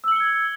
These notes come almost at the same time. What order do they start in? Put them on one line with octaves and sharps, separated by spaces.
E6 F#7 C#7 G7 G#6